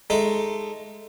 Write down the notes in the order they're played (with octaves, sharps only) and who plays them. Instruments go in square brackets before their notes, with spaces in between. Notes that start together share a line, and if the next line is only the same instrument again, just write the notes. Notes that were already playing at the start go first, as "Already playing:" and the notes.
[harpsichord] G#3 A3 D#4